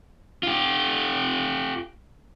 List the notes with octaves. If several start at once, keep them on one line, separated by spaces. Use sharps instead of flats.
F4 G4